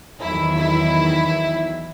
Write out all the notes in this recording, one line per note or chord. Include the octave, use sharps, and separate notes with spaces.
E2 D#3 F#3 E4
E4